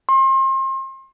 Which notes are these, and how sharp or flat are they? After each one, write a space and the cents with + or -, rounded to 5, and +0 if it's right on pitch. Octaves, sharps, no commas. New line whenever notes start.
C6 +35